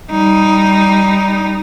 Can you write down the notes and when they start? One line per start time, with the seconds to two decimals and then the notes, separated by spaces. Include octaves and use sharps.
0.11 G3 D#4